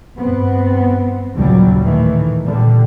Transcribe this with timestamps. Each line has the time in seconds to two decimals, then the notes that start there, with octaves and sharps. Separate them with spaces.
0.18 G2 B3 C4
1.34 A#1 D#2 A#2 C#3 F#3 G3
1.83 A2 D#3 E3 A3
2.45 A#2 D3 G3